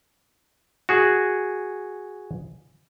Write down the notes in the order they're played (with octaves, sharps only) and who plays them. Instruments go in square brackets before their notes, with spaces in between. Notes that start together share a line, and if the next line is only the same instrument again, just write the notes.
[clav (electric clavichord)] F#4 G#4